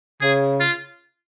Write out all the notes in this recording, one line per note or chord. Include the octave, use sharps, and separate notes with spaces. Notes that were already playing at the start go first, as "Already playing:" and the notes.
C#3 G#4
F4